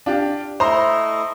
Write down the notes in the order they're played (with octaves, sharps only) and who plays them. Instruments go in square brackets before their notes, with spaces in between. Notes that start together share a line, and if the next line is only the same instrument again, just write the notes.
[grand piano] D4 F4 G4
[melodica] A3 E4 D#5 [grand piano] C5 A#5 C6